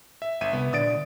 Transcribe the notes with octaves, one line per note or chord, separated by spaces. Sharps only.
E5
G1 E5 D#7
C2 B3
A#2 D3 D5 D#6 A6 D7